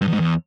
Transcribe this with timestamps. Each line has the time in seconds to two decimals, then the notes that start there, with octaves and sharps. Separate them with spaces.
0.01 G2
0.08 E2
0.14 G#2
0.20 E2